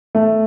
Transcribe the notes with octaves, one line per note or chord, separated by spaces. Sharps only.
A3